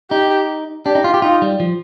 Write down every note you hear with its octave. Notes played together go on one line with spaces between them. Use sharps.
D#4 G4
D4 G4
D#4
F4
G4
D#4 F4
G3
F3